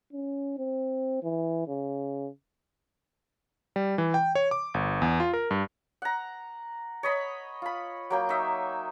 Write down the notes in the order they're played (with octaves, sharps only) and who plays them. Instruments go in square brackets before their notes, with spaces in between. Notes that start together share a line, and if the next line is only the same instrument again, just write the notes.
[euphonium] C#4
C4
E3
C#3
[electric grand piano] G3
E3
G5
C#5
D6
G1
E2
F4
A#4
G2
[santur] F#5 A#5
C#5 D#5 B5
F4 B5
F#3 A#3 G5
D#4 E5